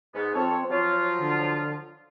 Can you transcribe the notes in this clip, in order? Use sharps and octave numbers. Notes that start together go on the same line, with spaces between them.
G#2 B3
F2 C4 A4 C#5
F3 F#3 F4 C#5
D3